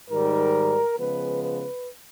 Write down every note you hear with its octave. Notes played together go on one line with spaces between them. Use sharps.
G#2 D#3 G3 A#4
C#3 F3 G#3 B3 B4
B4